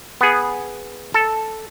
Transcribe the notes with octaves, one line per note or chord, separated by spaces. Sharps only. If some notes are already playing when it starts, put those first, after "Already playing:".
B3 G#4
A4